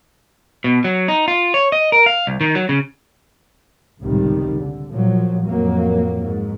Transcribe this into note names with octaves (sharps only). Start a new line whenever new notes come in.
B2
F#3
D#4
F4
C#5
D#5
A#4
F5
C2
D#3
F#3
C#3
G#1 C#2 A2 C3 D#3 G3
D3
A#2 F3 F#3
F2 A2 F#3 A#3
G#2